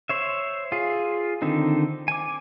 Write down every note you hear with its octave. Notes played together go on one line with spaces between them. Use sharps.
C5 C#5 E5
F4 G#4
D3 D#3 C4 D#4
G#5 D6